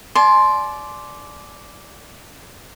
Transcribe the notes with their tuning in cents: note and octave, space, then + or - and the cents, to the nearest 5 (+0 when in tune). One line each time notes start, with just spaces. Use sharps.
D5 -5 G#5 +45 C6 +0